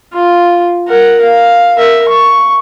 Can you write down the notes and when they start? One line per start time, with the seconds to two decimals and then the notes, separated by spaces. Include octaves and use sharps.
0.13 F4
0.88 A#4 F#5
1.22 F5
1.77 A#4 E5
2.09 C#6